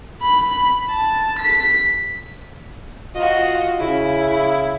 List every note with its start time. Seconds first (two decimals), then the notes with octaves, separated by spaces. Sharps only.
0.22 B5
0.89 A5
1.39 B6
3.16 F4 F#4 D#5
3.80 C#3 E4